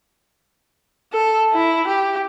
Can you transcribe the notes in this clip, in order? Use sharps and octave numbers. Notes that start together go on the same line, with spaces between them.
A4
E4
G4